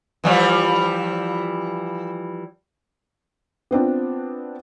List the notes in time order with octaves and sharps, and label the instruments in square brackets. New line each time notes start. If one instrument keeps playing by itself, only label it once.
[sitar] E3 F3 G3
[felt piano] B3 C4 D4 F4